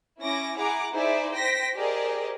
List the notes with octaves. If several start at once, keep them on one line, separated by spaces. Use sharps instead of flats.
C#4 E4 D6 A#6 D7
E4 G#4 F#5 A#5 D6
D#4 E4 G#4 C5 D5 E5
C5 G5 A#6 B6
G4 G#4 A#4 C5 D5 D#5